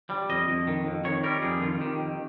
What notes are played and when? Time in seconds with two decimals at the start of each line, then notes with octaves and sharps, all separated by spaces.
0.10 G3
0.29 F2 D#5
0.48 F2
0.67 D#3
0.86 F2
1.04 D#3 C#5
1.23 G3 A#4
1.42 F2 G#4
1.62 D#3 F4
1.81 D#3 G4
1.99 F2